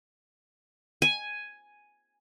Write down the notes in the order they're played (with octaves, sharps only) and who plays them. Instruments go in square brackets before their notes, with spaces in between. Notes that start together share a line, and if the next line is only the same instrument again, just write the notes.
[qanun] G#5